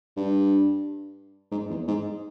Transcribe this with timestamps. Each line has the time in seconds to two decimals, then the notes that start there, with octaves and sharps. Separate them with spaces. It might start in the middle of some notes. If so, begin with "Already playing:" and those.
0.17 G2
1.51 G#2
1.70 E2
1.88 G#2